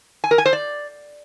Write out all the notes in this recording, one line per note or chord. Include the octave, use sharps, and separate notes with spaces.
G#5
A#4
G#5
C5
D5